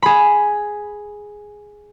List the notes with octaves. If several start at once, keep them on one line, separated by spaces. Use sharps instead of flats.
G#4 B5